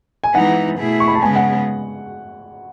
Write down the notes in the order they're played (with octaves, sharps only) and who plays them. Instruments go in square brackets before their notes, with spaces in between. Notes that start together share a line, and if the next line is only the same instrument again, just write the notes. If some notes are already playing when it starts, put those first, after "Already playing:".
[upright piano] G#5
[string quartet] E3 G#3 B3 D#4 [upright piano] F#5
[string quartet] B2 A3 E4 G#4
[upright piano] C#6
B5
A5
[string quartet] C#3 G#3 B3 [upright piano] G#5
[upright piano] F#5